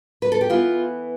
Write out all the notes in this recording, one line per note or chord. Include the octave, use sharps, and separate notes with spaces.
B4
A4
G4
E3 B3 F4